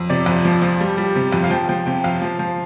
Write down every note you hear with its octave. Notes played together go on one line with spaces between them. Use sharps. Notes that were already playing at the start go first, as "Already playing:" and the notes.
Already playing: F2
C3 D5
F2
F3
F3
G3
G3
C3
F2
F5
F3 G5
F3 G5
C3 G5
F2 F5
F3
F3